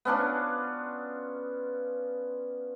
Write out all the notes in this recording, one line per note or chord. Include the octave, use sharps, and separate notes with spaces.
B3 C#4 D4 F4